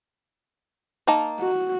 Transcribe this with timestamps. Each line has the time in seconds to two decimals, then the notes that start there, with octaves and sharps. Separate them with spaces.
1.07 A#3 D#4 A5
1.40 F#4